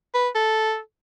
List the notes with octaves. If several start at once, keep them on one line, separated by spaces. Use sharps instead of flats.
B4
A4